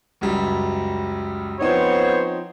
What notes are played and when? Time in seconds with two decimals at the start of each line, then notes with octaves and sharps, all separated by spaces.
0.21 C#2 F#2 G3
1.61 F3 B3 C4 D#4 C5 C#5